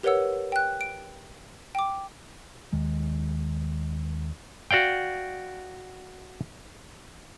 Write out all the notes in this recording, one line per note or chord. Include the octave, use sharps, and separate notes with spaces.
G4 A#4 B4 C#5 F#5 E6
G5 F#6
D7
G5 D6
D#2 D#3 G#3
F#4 D5 F5 G5